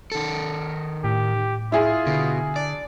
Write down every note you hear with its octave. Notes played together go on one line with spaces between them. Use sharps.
D#3 A4
A2 G4
E4 F4 G#4
B2 D3
D4 D5